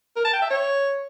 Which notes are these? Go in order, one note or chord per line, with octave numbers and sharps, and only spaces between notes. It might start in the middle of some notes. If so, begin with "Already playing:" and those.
A#4
A5
G5
E5
C#5